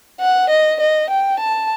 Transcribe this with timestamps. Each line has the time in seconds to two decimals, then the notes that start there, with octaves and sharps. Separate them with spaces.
0.20 F#5
0.50 D#5
0.80 D#5
1.10 G5
1.39 A5